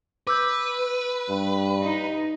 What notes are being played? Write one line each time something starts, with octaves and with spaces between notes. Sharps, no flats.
B4 D6 E6 G6
G2
D#4